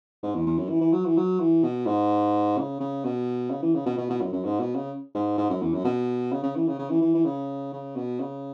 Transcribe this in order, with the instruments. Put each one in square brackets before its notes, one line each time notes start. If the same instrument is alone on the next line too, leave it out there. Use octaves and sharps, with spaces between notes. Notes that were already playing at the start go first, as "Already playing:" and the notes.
[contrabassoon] G#2
E2
E2
F#2
E3
E3
F#3
E3
F#3
E3
B2
G#2
C#3
C#3
B2
C#3
E3
C#3
B2
B2
B2
F#2
F#2
G#2
B2
C#3
G#2
G#2
F#2
E2
F#2
B2
C#3
C#3
E3
C#3
C#3
E3
E3
E3
C#3
C#3
B2
C#3